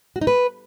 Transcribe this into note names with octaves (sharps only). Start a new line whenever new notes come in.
F#4
D#4
B4